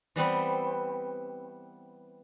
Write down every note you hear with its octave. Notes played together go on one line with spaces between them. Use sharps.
E3 G3 B3 C4